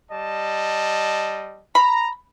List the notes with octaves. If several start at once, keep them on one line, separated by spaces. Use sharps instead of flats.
G3 D#5 A5
A#5 B5